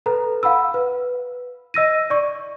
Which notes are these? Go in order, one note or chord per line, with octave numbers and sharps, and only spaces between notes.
A4 B4 A#5
F5 F#5 B5 E6
B4
D#5 E6 A#6 D#7
D5 C#6